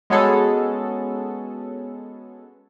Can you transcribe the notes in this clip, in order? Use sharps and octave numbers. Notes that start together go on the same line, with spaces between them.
G#3 B3 C#4 F#4 G#4 A4